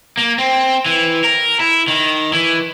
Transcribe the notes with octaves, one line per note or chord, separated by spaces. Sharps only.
A#3
C4
E3
A#4
E4
D#3
E3